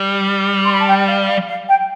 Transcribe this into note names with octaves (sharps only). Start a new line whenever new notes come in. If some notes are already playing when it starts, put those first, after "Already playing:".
Already playing: G3
C6
B5
A5
G5
F5
F5
F5
G5